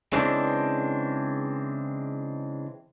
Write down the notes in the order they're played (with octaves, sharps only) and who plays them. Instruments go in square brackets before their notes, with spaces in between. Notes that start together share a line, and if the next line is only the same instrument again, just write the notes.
[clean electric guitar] C#3 E3 G#3 C4 D4